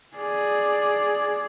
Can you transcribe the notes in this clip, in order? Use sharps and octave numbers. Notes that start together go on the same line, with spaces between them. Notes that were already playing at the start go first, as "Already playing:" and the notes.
G#4 D5